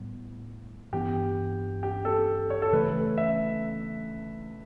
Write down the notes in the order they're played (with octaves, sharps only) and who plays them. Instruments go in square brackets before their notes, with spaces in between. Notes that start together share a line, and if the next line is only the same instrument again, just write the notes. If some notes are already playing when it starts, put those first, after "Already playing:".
Already playing: [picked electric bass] A2 G3 B3
[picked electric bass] G2 E3 B3 [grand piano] G4
[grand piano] G4
A4
C#5
A4
[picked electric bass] C#3 E3 A3 [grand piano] B4
[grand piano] E5